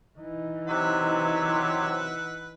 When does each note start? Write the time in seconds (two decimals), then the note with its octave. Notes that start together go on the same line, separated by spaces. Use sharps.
0.19 E3 D#4
0.68 C3 F#3 B4 E5 F#5